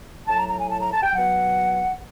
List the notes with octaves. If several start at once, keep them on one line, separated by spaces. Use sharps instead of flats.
A2 F#3 A5
A#5
A#5
G#5
A5
A#5
A5
G5
B2 F#3 F#5